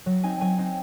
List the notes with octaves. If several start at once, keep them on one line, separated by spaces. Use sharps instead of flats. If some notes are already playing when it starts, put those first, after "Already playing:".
F#3
C4 D#4 G#5
F#3 G#5
C4 D#4